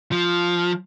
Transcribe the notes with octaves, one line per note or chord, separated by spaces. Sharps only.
F3